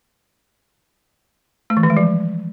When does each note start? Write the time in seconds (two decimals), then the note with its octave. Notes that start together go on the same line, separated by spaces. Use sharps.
1.70 A3
1.77 E3
1.83 D#3
1.90 G#3
1.97 F3